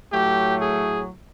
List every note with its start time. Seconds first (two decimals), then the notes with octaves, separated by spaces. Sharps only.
0.13 A2 F#3 A3 G4
0.60 G#4